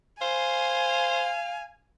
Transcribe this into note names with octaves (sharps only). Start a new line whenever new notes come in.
C5 F5 G#5